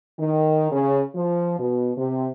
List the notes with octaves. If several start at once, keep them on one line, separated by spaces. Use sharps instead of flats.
D#3
C#3
F3
B2
C3